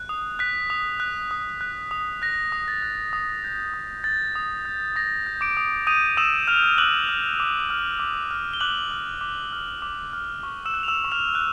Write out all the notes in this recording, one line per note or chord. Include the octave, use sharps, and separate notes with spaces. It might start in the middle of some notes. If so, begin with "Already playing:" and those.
Already playing: F#6
D#6
F#6 B6
D#6
F#6
D#6
F#6
D#6
F#6 A#6
D#6
A6
F#6
D#6
G6
D#6
G6 A6
D#6
G6
D#6 A#6
G6
D6 D7
D#6
D#6 G6 D#7
D#6 E6 E7
F6 G6 F7
D6 F#6 F#7
F6
D6
F6
D6
F6
G7
D6 F#6 F#7
F6
D6
F6
D6
F6
C#6
E6 E7
F#6
F7
E6 E7
C#6
F6 F7
F#6